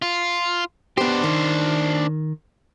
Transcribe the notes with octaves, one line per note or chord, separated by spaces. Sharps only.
F4
B3 D4 G4 C5
D#3